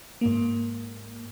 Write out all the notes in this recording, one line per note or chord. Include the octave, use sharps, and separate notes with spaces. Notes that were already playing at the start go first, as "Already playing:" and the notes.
G#2 A#3